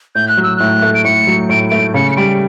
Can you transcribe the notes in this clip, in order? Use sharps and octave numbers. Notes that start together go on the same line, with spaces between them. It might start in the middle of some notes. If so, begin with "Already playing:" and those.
A2 G6
F#6
F#3
E6
A2 F#6
A3
D7
A2 C#7
F#3
A2 D7
A3 D7
C#3 C#7
C#7
G3 D7